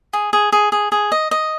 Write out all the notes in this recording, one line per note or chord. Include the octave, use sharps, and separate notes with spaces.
G#4
G#4
G#4
G#4
G#4
D#5
D#5